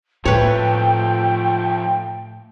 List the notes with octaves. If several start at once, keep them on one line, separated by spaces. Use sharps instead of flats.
A2 F3 A3 B4 C#5 G5